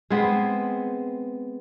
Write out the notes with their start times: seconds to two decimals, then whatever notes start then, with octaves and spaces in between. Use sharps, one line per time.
0.10 G#3 B3 C4